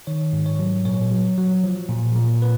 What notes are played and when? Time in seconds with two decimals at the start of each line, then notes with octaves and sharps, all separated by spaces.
0.07 D#3 C#5
0.33 G#2
0.46 C#5
0.59 F#3
0.85 A#2 C#5
1.11 F#3
1.38 F#3
1.64 F3
1.89 A#2
2.16 A#2
2.42 B4